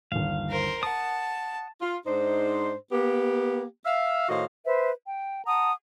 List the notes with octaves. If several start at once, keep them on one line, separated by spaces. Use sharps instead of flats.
G1 D#2 F5
A#4 C5
A#4 F#5 A5 D#6
F4
G#2 D4 D#4 C5
A#3 B3 G4
E5 F5
A2 D#3 F#4 C5 D#5 F5
B4 C5 E5
G5
F#5 A5 A#5 D#6